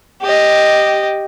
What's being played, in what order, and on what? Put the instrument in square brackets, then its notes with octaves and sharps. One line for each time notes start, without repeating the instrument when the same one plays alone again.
[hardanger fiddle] G4 D#5